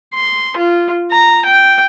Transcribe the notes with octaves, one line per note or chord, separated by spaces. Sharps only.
C6
F4
A#5
G5